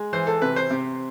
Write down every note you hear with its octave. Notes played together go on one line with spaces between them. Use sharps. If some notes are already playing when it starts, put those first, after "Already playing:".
Already playing: G#3
E3 C5
A4
C3 B4
C5
C3